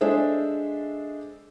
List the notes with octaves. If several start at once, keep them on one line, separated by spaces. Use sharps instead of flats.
G#3 D4 G#4 A4 C5 E5